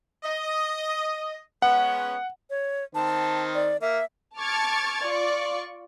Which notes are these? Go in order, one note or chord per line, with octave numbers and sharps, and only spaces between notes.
D#5
G#3 B3 C#4 F#5
C#5
D#3 C4 A5
D5
A#3 E5
A5 C#6 D6 F6 G#6 A6
F4 D5 C#6